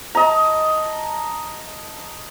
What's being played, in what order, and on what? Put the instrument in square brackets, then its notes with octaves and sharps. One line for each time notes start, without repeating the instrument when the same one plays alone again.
[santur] D#5 A5 A#5